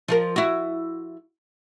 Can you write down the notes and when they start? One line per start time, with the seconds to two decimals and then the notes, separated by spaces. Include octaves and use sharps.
0.08 F3 F4 A#4
0.36 E4 F#4